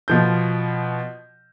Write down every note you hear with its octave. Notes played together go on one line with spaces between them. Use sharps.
B2 F3 G6